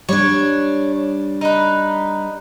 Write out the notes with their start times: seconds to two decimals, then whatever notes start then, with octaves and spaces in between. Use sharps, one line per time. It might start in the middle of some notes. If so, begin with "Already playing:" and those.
0.09 G3 D4 C#5
1.41 D#4 B4